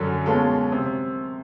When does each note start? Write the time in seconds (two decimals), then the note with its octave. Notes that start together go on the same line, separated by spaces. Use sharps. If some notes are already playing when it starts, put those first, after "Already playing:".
Already playing: F#2 D3 F#3
0.26 B2 G#3 C#4 F4 A4
0.72 C3